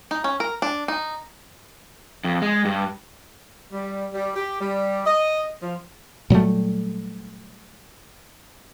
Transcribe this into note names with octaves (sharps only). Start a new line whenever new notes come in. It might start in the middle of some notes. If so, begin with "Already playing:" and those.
D#4
C#4
A#4
D4
D#4
F2
G#3
G2
G3
G3
G4
G3
D#5
F3
A#2 F#3 G3 A3